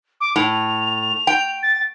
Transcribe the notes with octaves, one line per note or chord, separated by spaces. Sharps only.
D6
A2 F7
G5
A6